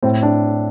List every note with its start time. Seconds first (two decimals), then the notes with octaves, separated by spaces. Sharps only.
0.03 A2 C4
0.23 D4